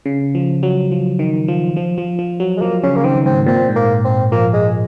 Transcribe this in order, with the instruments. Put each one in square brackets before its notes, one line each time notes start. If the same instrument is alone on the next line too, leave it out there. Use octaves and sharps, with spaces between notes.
[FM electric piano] C#3
F3
F#3
F3
D#3
F3
F3
F3
F3
F#3
[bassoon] G#3
[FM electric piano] F3 [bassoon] A#3
[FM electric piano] C#3 [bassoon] C#4
[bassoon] A#3
[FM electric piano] D#3 [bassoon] C4
[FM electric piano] G#2 [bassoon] C4
[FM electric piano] A#2 [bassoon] C4
[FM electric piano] G#2
[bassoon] A#3
C4
[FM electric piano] F3 [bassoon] A#3
[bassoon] G#3